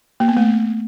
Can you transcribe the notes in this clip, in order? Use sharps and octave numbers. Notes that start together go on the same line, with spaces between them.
A#3
B3
A3